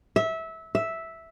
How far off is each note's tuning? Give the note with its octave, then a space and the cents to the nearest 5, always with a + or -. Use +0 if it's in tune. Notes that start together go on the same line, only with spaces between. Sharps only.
E5 -20
E5 -5